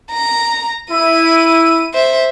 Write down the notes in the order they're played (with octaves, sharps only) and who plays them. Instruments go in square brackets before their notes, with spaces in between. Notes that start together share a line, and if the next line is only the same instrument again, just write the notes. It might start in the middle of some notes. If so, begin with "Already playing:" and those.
[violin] A#5
[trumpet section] E4 [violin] D#7
[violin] C5 E5